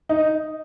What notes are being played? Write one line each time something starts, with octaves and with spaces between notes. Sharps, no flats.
D#4